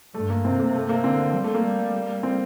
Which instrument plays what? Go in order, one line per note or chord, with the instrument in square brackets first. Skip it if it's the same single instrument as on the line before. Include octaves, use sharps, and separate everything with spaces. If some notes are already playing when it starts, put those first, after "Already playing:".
[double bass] G2 [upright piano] A3
[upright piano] A#3
[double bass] C3 [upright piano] C4
[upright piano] A#3
A3
A#3
[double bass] D3 [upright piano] C4
[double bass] G3
[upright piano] A3
A#3
[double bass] G3
[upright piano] C4